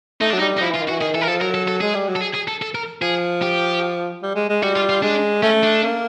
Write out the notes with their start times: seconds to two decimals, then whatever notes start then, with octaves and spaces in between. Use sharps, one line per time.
0.21 A3 D#4
0.30 F#3 D4
0.39 G3 D#4
0.57 D#4
0.61 F3 E4
0.71 E3 F4
0.81 D#3
0.88 F#4
0.91 E3
1.01 D#3 G#4
1.14 E3 A4
1.21 A#4
1.28 F3 A4
1.41 F#3 A#4
1.54 A4
1.68 A4
1.81 G#3 G#4
1.95 G3
2.08 F#3
2.16 A4
2.22 G#4
2.35 G#4
2.48 A4
2.62 A4
2.75 A#4
3.01 F3 G#4
3.42 G4
4.22 G3
4.35 G#3
4.49 G#3
4.63 G3 F#4
4.76 F4
4.89 F4
5.02 G#3 D4
5.42 A3 C#4
5.63 D4
5.83 A#3